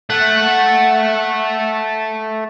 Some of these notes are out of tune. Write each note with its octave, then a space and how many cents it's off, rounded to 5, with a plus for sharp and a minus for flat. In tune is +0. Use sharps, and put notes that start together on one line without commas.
A3 -5 F#5 +0